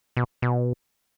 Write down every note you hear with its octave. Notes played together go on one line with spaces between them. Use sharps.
B2
B2